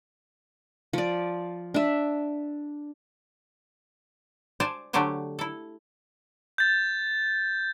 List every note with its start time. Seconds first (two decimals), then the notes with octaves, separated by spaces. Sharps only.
0.93 F3 D5
1.74 D4 E5
4.60 C5 D5 G#5 A5
4.93 D3 F#3 A3 G4 C5 G#5
5.39 E4 A4
6.58 G6 A6